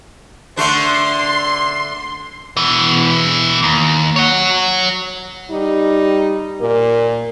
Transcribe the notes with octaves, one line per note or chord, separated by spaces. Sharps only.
D3 A3 D4 C6
B2 E3
D#2
C#5 F#5
G3 D#4
A#2 A#3